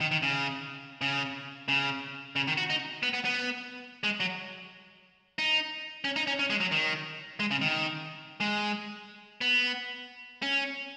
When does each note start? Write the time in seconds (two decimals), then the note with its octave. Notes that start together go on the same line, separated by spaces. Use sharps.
0.01 D#3
0.11 D#3
0.23 C#3
1.01 C#3
1.68 C#3
2.36 C#3
2.47 D#3
2.57 F#4
2.70 D#4
3.03 B3
3.14 B3
3.25 B3
4.04 G#3
4.20 F#3
5.39 D#4
6.04 C#4
6.16 D#4
6.27 C#4
6.39 C#4
6.50 G#3
6.60 F#3
6.72 D#3
7.40 G#3
7.51 C#3
7.62 D#3
8.40 G#3
9.41 B3
10.42 C#4